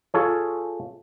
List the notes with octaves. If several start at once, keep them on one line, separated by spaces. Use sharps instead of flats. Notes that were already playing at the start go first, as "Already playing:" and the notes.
F4 G#4 A4 C#5